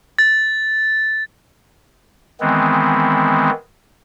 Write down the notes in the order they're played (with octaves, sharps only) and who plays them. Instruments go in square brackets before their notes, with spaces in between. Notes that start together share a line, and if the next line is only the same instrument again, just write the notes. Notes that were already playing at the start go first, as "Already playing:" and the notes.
[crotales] A6
[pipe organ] D#3 E3 G#3 B3 C4